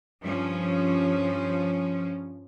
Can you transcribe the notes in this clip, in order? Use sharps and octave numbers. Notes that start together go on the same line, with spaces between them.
G2 F3 C#4